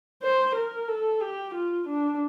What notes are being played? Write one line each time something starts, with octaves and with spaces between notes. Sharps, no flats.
C5
A#4
A4
G4
F4
D4